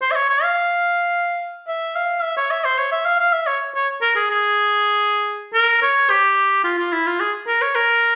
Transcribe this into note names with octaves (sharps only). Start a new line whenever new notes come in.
C5
E5
C#5
C#5
F5
E5
F5
E5
C#5
E5
C5
C#5
E5
F5
F5
E5
C#5
C#5
A#4
G#4
G#4
A#4
C#5
G4
F4
F4
E4
F4
G#4
A#4
C#5
A#4